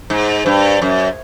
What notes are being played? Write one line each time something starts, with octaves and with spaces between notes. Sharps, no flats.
G#2
G2
F#2